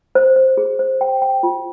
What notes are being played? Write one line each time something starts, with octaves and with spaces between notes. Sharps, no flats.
C5
C5
G#4
C5
G5
G5
F4